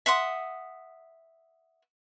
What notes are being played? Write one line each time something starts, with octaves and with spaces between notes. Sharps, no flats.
E5 F#5 C6 D#6